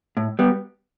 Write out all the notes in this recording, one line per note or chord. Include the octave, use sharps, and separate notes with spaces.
A2
G3 B3